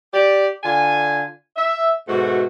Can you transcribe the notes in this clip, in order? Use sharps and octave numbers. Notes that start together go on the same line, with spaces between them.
G4 D5
D3 F4 G#5
E5
G#2 B2 A3 F#4